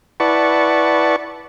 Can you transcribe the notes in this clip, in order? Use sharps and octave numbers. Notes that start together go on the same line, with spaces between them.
E4 B4 D5 F#5 A5 C#6